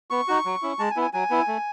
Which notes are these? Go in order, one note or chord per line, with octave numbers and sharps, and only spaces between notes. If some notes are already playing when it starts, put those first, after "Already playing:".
B3 C#6
D#4 F#4
F#3
C#4 E4
G#3 A5
G#5
B3 E4
G#5
F#3 G#5
B3 E4
A3